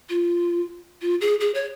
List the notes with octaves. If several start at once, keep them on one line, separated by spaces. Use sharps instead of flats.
F4
F4
G#4
G#4
C#5